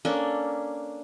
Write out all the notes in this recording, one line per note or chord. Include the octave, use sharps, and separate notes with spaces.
A#3 C#4 D4 A4